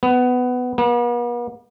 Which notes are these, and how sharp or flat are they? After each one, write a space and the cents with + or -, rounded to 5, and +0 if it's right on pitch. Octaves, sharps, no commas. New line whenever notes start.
B3 +15
B3 -45